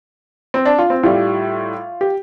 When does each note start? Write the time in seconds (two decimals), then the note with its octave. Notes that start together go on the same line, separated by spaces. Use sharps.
0.54 C4
0.65 D4
0.79 F4
0.90 C4
1.03 A2 G3 F4
2.01 G4